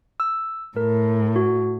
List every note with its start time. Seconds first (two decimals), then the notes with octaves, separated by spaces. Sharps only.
0.20 E6
0.77 A2 A#4
1.36 F#4